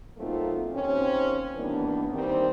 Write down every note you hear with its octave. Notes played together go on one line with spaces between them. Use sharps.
F#3 A3 A#3 C4 D#4 F4
D#2 C4 C#4
G2 D#3 E3 A#3 B3 D4
D#3 G3 A#3 C4